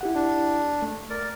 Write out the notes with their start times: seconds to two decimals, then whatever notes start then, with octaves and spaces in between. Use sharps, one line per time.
0.01 E4 G4 F#5
0.15 D4
0.82 A3
1.10 A#4 D5